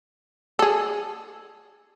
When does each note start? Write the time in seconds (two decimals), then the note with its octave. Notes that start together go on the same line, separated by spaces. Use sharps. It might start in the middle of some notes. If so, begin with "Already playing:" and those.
0.59 G#4 A4